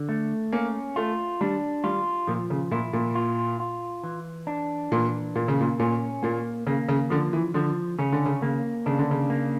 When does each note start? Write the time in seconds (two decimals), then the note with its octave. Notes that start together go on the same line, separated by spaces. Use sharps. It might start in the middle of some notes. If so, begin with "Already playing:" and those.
Already playing: D3
0.09 A3
0.52 A#3 C#4
0.96 A3 F4
1.41 G3 D4
1.84 G3 F4
2.27 A#2 F3
2.50 C#3
2.71 A#2 E4
2.93 A#2
3.15 F4
3.60 F4
4.04 E3
4.47 D4
4.91 A#2 E3
5.35 A#2 A#3
5.48 C#3
5.61 A#2
5.79 A#2 C#4
6.23 A#2 A#3
6.67 C#3 A#3
6.89 C#3
7.10 D3 F3
7.33 E3
7.54 D3 F3
7.99 C#3 C#4
8.12 D3
8.26 C#3
8.42 C#3 A#3
8.86 C#3 D4
8.99 D3
9.11 C#3
9.30 A#3